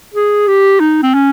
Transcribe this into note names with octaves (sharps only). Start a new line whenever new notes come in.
G#4
G4
D#4
C4
C#4